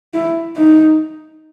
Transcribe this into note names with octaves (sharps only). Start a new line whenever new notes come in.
E4
D#4